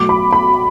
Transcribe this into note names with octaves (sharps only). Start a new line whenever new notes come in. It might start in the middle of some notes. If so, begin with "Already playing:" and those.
Already playing: B2 F#3 A3 D6
B5
B5